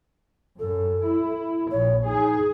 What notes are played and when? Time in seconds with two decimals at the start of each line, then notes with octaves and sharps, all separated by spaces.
0.59 F#2 A4
1.04 E4
1.71 A#1 C#5
2.06 D#4 G#4